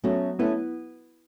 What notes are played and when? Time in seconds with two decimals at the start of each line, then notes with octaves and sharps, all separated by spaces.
0.04 F#3 A3 B3 C#4 F#4
0.39 A3 B3 C#4 E4 B4